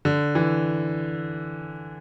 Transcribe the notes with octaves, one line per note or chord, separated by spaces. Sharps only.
D3
E3